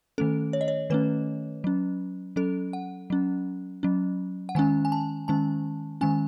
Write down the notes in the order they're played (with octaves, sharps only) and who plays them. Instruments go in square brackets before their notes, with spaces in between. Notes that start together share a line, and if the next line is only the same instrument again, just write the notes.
[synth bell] D#3 A3 C#4 A4
C#5
D#5
C#5
D#3 A3 C#4 B4
F#3 C#4
F#3 C#4 A4
F#5
F#3 C#4
F#3 C#4
F#5
D#3 G#3 C#4 G#5
G#5
A5
D#3 G#3 C#4 A5
D#3 G#3 C#4 G#5